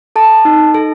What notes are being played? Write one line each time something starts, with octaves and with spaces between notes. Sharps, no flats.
A4 A5
D#4
A4